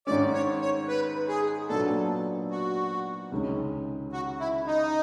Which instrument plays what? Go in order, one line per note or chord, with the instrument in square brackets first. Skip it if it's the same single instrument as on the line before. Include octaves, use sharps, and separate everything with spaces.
[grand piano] G#2 D#3 G#3 C#4 [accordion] D5
[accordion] C#5
C#5
B4
G#4
[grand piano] A#2 F#3 B3 D4 [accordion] A4
[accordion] F#4
[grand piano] C#2 C3 D#3 G#3 C#4
[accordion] F#4
E4
D#4